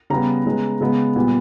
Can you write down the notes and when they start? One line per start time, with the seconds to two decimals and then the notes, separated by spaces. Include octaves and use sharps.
0.10 C#3 G3 B3 A#5
0.46 C#3 G#3 B3
0.80 C#3 G#3 B3
1.16 A#2 G3 B3